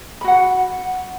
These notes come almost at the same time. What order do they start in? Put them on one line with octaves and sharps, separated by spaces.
B5 F#4 F#5